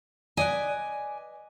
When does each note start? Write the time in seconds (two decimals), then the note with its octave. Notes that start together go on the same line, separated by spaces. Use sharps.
0.37 B4 D5 D#5 G#5